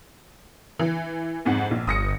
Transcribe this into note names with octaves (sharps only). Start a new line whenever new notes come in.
E3
F2 G#2 F#5
A#1
G1 D#6 A#6 C#7